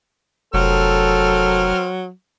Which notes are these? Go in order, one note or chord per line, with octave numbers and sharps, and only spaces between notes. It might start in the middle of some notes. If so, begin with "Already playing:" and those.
F1 F#3 C4 A4 A#4 F6